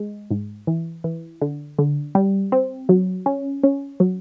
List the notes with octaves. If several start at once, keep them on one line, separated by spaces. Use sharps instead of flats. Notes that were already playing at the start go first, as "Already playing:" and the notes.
Already playing: G#3
G#2
E3
E3
D3
D3
G3
C4
F#3
C#4
C#4
F#3